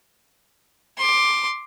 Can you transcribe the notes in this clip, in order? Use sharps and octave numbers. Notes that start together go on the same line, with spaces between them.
C6 D6